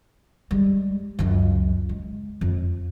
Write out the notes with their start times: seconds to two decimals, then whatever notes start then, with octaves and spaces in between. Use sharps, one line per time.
0.51 G3 G#3
1.19 C#2 F#2
1.89 G#3
2.41 F2